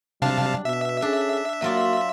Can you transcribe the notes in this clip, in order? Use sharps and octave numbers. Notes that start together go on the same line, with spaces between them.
C3 F#3 G3 D4 F5 A5
B2 E5
C#4 D4 G#4 A4
F#3 A#3 F4 F#4 D5